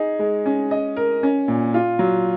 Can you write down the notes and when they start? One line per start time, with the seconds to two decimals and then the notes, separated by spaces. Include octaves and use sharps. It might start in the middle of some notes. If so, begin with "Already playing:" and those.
Already playing: D#4 G#4
0.19 G#3
0.46 C#4
0.71 D#5
0.96 A#4
1.23 C#4
1.48 A#2
1.74 F4
1.99 F#3